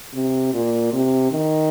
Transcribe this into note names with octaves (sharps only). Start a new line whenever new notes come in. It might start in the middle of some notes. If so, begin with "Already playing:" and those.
C3
A#2
C3
D#3